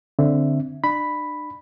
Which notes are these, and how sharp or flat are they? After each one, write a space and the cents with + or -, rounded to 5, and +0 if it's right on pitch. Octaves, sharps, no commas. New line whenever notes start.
D3 +0 C4 +0 E5 +0
D4 +40 B5 +0